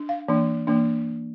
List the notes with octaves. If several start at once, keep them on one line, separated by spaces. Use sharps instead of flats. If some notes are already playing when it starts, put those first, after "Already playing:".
Already playing: D4
F5
E3 A#3 D4
E3 A#3 D4